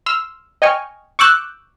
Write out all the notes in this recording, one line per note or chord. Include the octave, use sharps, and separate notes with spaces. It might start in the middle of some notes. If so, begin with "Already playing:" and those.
C6 E6 F6
D#5 G5 G#5 C#6 F6
C#6 D6 E6 F#6 G6